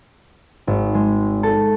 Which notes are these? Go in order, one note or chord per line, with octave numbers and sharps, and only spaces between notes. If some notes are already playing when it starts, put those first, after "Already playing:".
G#1
G#3
A4